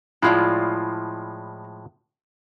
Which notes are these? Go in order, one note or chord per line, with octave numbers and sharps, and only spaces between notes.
A2 F3 G#3 E4 F4 D5